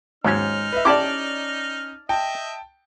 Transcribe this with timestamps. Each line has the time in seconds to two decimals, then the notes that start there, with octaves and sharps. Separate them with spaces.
0.24 D#2 G#2 F#3 C#4 D#4 F6
0.72 B4 D#5 E5
0.85 C#4 E4 G4 D5 A5 D6
2.09 D#5 E5 G5 A5